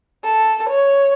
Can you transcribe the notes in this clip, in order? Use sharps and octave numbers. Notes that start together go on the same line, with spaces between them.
A4
C#5